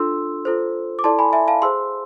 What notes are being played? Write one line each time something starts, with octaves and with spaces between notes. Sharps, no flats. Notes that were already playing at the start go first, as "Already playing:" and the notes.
Already playing: D4 F4 A4 C6 E6
F4 A4 C5
D6
E4 A4 D5 A5 C6
G#5 B5
E5 G#5
F5 A5
G#4 C5 C6 E6